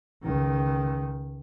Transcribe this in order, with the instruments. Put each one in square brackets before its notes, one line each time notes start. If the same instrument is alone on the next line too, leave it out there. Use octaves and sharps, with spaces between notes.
[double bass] C#2 D#3